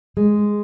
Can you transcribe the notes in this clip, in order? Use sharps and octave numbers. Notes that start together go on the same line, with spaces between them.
G#3